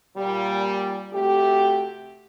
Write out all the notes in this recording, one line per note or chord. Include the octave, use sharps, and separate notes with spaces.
A#2 G3
C3 A3 F#4 G4